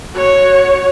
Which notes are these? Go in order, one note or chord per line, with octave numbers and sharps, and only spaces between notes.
F#4 C#5